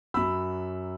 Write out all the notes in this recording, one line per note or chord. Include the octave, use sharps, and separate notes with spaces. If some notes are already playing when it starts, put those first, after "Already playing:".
F#2 F#3 B5 E6